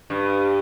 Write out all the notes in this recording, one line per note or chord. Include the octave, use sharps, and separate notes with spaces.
G2